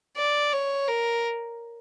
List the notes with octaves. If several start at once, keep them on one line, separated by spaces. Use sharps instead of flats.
D5
C#5
A#4